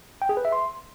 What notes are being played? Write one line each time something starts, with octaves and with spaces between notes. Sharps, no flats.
G5
G#4
B4
E5
C6